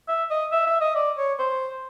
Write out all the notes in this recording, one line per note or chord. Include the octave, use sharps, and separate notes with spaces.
E5
D#5
E5
E5
D#5
D5
C#5
C5